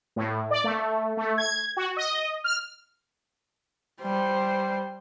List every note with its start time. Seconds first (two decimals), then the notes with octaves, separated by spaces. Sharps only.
0.16 A2
0.51 D5
0.64 A3
1.17 A3
1.38 G#6
1.77 F#4
1.97 D#5
2.44 F6
4.02 G3 C5